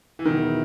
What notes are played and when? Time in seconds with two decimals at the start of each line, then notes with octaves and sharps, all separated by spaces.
0.19 E3
0.25 E2 B2 D#3 F#3 B3 E4